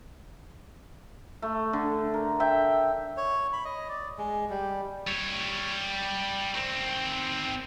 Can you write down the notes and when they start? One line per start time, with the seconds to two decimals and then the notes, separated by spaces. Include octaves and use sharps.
1.42 A3
1.73 D3
2.14 A#4
2.40 E5 G5
3.17 C#5
3.53 B5
3.65 D#5
3.88 D5
4.18 G#3
4.50 G3
5.07 G3 C#5
6.55 D#3 C4